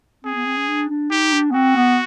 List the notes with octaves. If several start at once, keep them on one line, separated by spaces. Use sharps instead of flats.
C4 G#4
B3
C4
C#4
D4
D4
D#4 G4
D4
B3
C4 F#4
B3